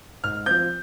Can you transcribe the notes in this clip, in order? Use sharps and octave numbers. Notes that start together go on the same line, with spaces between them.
G#2 F6
F3 C4 G6